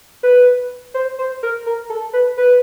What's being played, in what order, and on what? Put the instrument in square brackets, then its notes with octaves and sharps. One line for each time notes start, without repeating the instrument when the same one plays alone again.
[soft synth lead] B4
C5
C5
A#4
A#4
A4
B4
B4